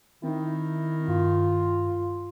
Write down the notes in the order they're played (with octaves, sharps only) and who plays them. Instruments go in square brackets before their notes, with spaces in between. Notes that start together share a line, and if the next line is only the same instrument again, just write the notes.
[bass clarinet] D#3 [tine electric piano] C4 D#4 [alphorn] E4
[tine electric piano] G2 [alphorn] F4